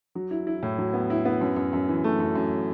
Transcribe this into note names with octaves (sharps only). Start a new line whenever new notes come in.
F#3
E4
E4
A2
F#3
B3
E4
B3
F#2
F#2
F#2
E3
A3
F#2
F#2